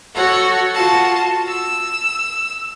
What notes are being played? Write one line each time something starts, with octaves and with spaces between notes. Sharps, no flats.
F#4 A4 C#5 F#5
F4 F#4 A5
E6